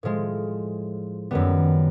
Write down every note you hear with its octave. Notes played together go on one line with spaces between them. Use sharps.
A2 F3 G#3
F#2 D#3 G3 B3